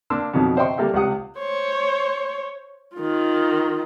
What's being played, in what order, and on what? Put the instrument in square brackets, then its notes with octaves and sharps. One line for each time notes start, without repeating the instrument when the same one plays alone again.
[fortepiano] A#3 D4 C6 E6
F2 B2 D#3 F#3
C5 D#5 E5 G5 C6 C#6
G3 A#3 A4 E5 G5
C#2 C3 G4 F#5 D#6 F#6
[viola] C5 C#5
D#3 F4